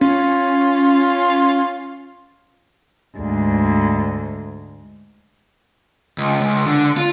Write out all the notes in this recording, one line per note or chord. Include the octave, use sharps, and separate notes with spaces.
C#4 F4
D2 G#2
C#2
C#2
D3
F4